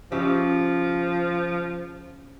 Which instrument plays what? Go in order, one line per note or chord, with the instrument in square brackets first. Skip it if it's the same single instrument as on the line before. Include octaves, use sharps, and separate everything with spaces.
[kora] C#3 G4 E5 [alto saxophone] F3